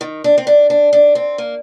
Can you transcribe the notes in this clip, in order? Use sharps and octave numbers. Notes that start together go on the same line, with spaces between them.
D#3
D4
C4
D4
D4
D4
C4
A#3